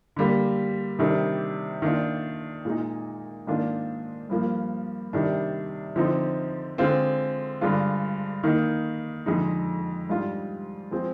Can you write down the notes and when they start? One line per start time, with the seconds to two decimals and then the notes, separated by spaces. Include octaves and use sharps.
0.16 D3 G3 A#3
0.99 C3 D#3 G3 D4
1.82 D#3 A#3 D4 F4
2.65 A#2 G#3 D#4
3.47 G#2 D#3 A#3 D4 F4
4.29 G2 F3 A#3
5.13 C3 D#3 G3 D4
5.96 D3 F3 C4 D#4
6.78 D3 G#3 C4 F4
7.61 G2 D3 G#3 D4 F4
8.43 D#3 A#3 D#4
9.26 F2 D3 G#3 D#4
10.09 G#2 G3 D4 F4
10.91 F3 G#3 C4